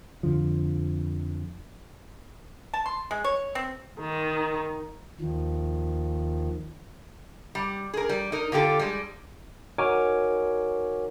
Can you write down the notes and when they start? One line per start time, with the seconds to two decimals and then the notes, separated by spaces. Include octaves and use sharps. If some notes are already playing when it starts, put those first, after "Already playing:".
0.23 F2 D3 F3
2.74 A5
2.86 C6
3.11 G#3
3.24 C#5
3.55 C4
4.01 D#3
5.21 D#2 D#3 F3
7.55 G3
7.94 G#4 A#4
8.09 G3
8.32 D#4 A#4
8.52 D3 F4 G4 A4
8.79 G3 G#3
9.78 D#4 F#4 A#4 C#5 G#5 D6